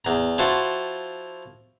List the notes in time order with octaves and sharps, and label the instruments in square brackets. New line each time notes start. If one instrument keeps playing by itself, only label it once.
[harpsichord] E2 A#5
F3 E4 F#4 A5 C6